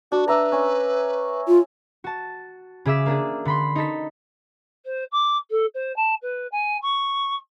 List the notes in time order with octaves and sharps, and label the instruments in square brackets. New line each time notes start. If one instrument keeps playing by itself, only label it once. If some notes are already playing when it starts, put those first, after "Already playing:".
[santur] D4 [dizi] F#4
[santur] D4 E5 A#5 [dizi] B4
[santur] C#4
[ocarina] F4
[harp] F#4 A5
C#3 G#4 E5 D6 E6 B6
A#3 D4 G#4
D3 B5 C6
D#4 A4 B6
[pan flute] C5
D6
A4
C5
A5
B4
G#5
C#6